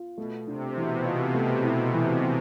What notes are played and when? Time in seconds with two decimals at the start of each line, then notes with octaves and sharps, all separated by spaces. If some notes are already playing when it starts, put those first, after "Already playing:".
Already playing: F4
0.17 B2 A3
0.47 C3 D4
0.76 B2 E3
1.05 F4
1.34 A3
1.64 E4
1.93 E3
2.22 E3